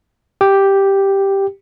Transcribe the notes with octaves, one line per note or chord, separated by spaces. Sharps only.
G4